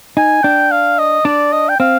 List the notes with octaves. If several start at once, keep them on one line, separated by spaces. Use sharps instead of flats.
D#4 G#5
D4 G5
F5
D#5
D4 D5
D#5
G5
C4 F5